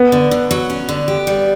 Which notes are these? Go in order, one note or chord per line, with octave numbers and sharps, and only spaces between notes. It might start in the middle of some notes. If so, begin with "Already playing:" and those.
Already playing: B3
D3
D3
F#3
C#4
D3
G4
G3